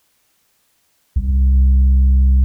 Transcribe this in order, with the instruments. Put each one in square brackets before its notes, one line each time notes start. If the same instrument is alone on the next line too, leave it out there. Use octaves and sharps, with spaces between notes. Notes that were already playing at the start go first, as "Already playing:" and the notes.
[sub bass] C2